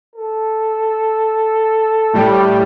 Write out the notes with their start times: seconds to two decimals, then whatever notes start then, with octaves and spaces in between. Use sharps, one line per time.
0.16 A4
2.13 A2 G3